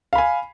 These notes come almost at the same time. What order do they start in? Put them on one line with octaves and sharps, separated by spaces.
F5 B5 G#5